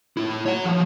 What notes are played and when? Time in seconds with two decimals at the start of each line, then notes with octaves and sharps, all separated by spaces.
0.17 A2 E4
0.46 C#5 F#5
0.65 F3 F#3